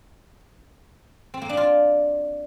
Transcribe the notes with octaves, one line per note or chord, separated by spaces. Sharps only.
C4
A#3
D4
F4